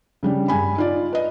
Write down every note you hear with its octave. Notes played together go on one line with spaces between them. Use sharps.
C#3 G3 D4
G2 G#4 G#5 B5
D#4 F4 D5
B4 D#5